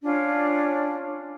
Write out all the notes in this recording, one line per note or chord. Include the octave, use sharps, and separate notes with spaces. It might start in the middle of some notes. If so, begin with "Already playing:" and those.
C#4 D4 F4 C#5